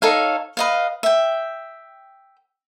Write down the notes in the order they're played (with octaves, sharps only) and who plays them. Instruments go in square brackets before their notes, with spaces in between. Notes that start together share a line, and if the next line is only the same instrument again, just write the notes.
[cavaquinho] D#4 A4 C#5 F5
B4 D#5 F5
E5 G5